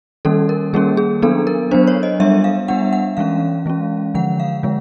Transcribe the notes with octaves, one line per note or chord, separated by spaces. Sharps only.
D#3 G3 A#3 C#4 A4
A#4
D#3 G3 A#3 C#4 G#4
G#4
F#3 B3 D4 A4
A#4
F#3 B3 D4 C5
C#5
D#5
G3 B3 D4 E5
F5
G3 B3 D4 F#5
F#5
E3 G#3 C#4 F5
E3 G#3 C#4
D3 F3 G#3 F#5
F5
D3 F3 G#3